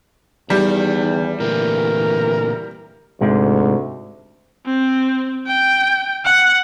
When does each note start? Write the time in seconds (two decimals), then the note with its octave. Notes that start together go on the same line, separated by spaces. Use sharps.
0.50 E2 D#3 G3
1.40 A#2 D3 E3 A3 A#4
3.21 D2 G#2 C3 G#3
4.66 C4
5.47 G5
6.25 F#5